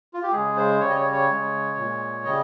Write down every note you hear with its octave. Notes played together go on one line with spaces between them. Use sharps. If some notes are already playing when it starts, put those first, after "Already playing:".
F4
G4
C#3 G#3 G#4
C5
C#3 G3 C#5
D#5
C#5
C#5
C#3 G#3
A#2 G#3
C#3 G3 D#5